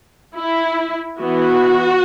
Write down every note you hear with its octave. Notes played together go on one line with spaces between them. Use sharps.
E4
E3 B3 F#4